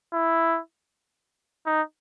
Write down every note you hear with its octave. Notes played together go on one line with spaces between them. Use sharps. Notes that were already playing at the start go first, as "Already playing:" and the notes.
E4
D#4